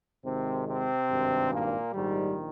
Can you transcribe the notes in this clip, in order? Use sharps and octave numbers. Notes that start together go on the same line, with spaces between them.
G#1 G#2 C3 D#3 C4
C3 C4
G#1 G2 D#3
A#2 A#3
A#1 G#2 D#3 G3